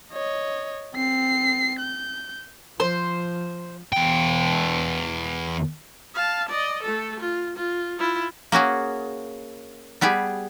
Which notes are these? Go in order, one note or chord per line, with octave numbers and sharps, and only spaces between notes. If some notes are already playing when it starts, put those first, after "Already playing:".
C#5 D#5
C4 C7
G6
F3 C5
E2 G5
F5 A5
D5 D#5
A3 A4
F4
F4
E4 F4
A#3 C#4 F#4 G#4
G3 B3 G4 G#4